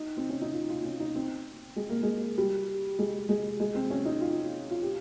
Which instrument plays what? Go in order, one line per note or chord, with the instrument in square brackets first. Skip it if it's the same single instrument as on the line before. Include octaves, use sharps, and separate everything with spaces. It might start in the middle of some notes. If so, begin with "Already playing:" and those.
Already playing: [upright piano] D#4
C4
C#4
D#4
F4
F4
C#4
D#4
C4
G#3
A#3
G#3
G3
G#3
G#3
G#3
C4
C#4
D#4
F4
F4
G4